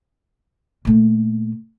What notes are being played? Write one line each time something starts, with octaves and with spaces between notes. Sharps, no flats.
A#2 A3